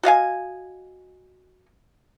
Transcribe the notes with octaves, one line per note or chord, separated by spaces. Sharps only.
F#4 D#5 F5 G#5